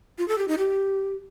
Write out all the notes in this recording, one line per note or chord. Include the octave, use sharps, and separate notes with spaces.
F4
A4
G4
D#4
G4